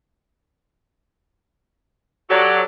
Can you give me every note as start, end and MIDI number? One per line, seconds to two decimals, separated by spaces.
2.30 2.60 54
2.30 2.63 67
2.30 2.63 69
2.30 2.63 74